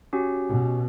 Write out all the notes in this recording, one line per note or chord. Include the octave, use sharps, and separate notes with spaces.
C#4 F#4 G4
B2